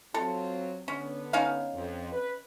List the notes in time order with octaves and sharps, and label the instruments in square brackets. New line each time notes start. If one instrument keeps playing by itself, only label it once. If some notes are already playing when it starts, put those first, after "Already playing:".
[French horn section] F#3 C4 F4 [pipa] A4
[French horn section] D3 B3 [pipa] C#4
[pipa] C#4 D#4 F5
[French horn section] F2
B4